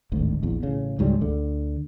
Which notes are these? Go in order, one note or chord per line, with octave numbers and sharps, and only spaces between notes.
D1 G#1 D2
A#1 E2
A1 C#3
C#2 G#2 F#3 G3
D2 D3